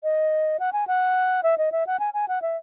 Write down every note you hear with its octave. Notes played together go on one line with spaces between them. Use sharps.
D#5
F#5
G#5
F#5
E5
D#5
E5
F#5
G#5
G#5
F#5
E5